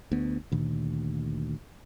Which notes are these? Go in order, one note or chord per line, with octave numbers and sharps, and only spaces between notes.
D2 B3
D2 A#2 D#3